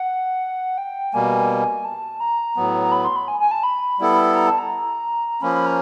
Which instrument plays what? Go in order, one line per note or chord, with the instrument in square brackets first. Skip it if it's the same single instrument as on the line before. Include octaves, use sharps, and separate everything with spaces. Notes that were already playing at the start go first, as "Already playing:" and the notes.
Already playing: [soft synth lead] F#5
G5
[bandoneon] B2 G3 A#3 [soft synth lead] G#5
[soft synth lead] A5
A#5
[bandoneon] A2 F#3 B3
[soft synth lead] A#5
B5
C6
B5
G#5
G#5
A5
B5
[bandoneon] G3 B3 E4 A4
[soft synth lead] A#5
A5
A#5
[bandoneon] F3 A#3 C#4 [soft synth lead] B5
[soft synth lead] B5
A#5